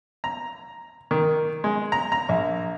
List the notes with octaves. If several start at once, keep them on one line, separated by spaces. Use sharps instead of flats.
A#5
D#3
G#3
A#5
A#5
A#1